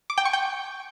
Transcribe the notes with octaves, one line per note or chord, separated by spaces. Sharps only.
D6
G5
C#6
G5